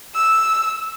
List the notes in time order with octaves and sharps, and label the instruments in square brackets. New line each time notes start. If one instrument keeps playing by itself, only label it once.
[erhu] E6